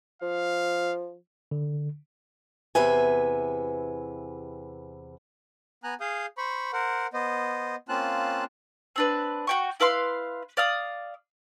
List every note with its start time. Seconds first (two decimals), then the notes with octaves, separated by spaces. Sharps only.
0.22 F3 F5
1.51 D3
2.75 E2 C3 B4 E5 G#5
5.84 B3 G#5 A#5 F#6
6.00 G#4 F5 D#6 G6
6.38 C5 B5 C#6
6.73 A#4 C5 F#5
7.13 B3 C5 D#5
7.89 A#3 C4 C#4 F4 A5 F#6
8.96 C4 D4 B4
9.47 F#4 G5 C#6
9.80 E4 B4 F5 C6
10.57 D5 F5 D#6